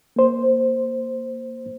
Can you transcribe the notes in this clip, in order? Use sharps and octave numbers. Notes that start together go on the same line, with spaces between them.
A#3 C5